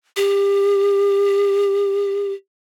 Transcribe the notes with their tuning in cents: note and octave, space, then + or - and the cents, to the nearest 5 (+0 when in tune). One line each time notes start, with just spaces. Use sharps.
G4 +35